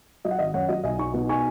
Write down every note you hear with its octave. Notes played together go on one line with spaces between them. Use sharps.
F#3 D#5
F#5
G#1 D#5
F#2 C#5 F#5
F#3 D#5
B1 D#5 G#5
D#4 G#5 C#6
B2
D#4 G#5 C#6